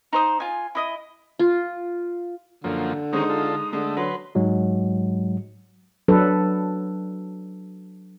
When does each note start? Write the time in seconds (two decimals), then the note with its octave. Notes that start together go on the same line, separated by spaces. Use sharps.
0.13 D#4 C5 D#6
0.40 F4 G#5
0.75 E4 D#5 D#6
1.39 F4
2.64 F#2 D3 F3 A#3
3.13 D#3 G#3 C4 D#4 C#5 D#6
3.30 F4 A4
3.73 D3 G#3 A3
3.97 F#3 B4 C6
4.35 G#2 F#3 G#3
6.08 F#3 D4 A4 B4